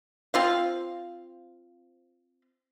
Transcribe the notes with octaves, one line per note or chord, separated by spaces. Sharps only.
C4 F4 F5